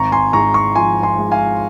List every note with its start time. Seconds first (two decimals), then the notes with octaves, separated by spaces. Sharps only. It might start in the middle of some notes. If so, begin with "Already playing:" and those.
Already playing: G#1 A#5 C#6
0.12 G#5 C6
0.33 G#2 A#5 C#6
0.54 A#5 C#6
0.75 F3 G#5 C6
1.03 G#5 C6
1.18 G#3
1.32 F5 G#5